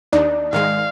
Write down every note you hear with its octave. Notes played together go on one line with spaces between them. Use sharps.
D#2 D4 D#4 D5
G#2 D#3 G#3 F5